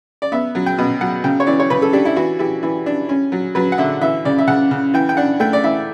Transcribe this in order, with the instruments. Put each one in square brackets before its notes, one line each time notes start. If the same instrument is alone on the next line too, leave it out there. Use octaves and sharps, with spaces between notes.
[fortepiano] D5
B3 E5
F#3
G5
B2
F#3 F#5
C#3 G5
C#5
E3 D5
C#5
C#3 B4
A4
D4 G4
E4
E3 F#4
E3 G4
E3
D4
C#4
F#3
F#3 B4
F#5
D3 E5
E3 E5
C#3 D5
E5
C#3 F#5
C#3
E3 G5
G5
D4 F#5
A3 G5
D5
E3 E5